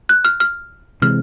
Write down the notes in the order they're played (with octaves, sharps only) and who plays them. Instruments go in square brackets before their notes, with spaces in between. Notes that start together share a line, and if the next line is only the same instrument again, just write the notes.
[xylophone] F#6
F6
F6
[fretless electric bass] C3 E3 G#3 C4 [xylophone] F6